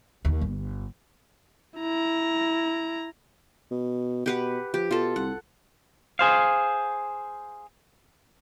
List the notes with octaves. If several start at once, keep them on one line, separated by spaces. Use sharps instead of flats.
D#2
G1
E4 A#5
B2
B2 G4 B4 F#5
F3 G4
B2 F4 A4
C2 F#5
G#4 C5 F5